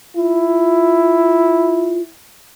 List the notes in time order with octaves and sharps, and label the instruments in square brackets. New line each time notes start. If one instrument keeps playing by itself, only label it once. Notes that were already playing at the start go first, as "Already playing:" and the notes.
[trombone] E4 [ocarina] F4